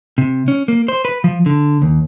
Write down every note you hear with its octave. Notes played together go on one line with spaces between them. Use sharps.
C3
C#4
A#3
C5
B4
F3
D3
D#2